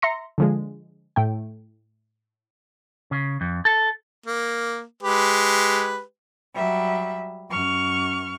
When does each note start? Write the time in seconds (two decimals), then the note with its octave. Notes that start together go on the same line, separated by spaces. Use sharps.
0.02 E5 A#5 C6 A#6 C#7
0.38 D3 F3 G#3
1.16 A2 A3 G5
3.11 C#3
3.41 F2
3.65 A4
4.26 A#3
5.03 G#3 G4 B4
6.54 F#3 G3 E5
7.49 F#2 C#6 F6